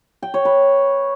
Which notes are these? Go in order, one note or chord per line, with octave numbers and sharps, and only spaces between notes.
G5
C#5
B4